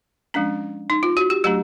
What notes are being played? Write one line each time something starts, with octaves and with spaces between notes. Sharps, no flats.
F3 G#3 C#4 D4
D#4
F4
F#4
G4
F#3 A3 D4 G4